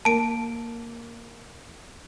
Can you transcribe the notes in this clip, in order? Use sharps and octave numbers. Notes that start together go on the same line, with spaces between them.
A#3 A5 D7